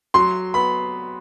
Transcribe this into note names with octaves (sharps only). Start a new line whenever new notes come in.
F#3 C6
B3 B5